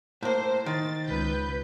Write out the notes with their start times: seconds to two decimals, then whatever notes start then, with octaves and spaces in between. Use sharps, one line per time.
0.23 A2 A#3 C5
0.66 D#3 A6
1.07 C#2 B4 G6